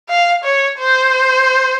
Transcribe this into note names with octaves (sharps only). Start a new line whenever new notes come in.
F5
C#5
C5